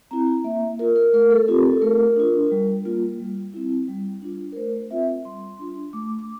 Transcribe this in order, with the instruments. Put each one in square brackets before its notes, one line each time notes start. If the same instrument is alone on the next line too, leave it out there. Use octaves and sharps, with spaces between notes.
[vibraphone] C4 E4 A#5
A#3 E5
F4 A#4
A#4
A3 A#4
A4
C4 F4 G4
A4
A3 A#4
D4 F4
G3
A#3 F4
G3
C4 E4
G3
D4 F4
A#4
A3 C5
C4 F4 E5
G3 C6
D4 F4
A3 D6
D6